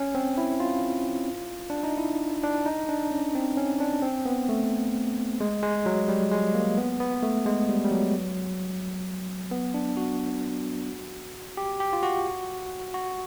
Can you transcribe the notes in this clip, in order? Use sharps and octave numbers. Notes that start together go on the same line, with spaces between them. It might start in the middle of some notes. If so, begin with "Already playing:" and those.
Already playing: C#4
C4
E4
F4
D4
D#4
E4
D4
D#4
D4
C#4
C4
C#4
D4
C4
B3
A3
G#3
G#3
F#3
G3
G#3
A#3
B3
B3
A3
G#3
G3
G3
F#3
B3
D4
F#4
G4
G4
F4
F#4
F#4